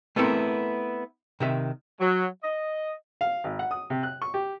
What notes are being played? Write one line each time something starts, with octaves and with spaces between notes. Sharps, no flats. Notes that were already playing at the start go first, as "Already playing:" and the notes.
A3 B3 C4 E4 A4 A#4
C3 D#3 E5
F#3
D#5
F5
G#1
F#5
D#6
C3
F#6
C#6
G4